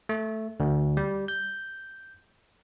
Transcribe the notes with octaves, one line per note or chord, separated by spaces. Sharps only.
A3
D2
G3
G6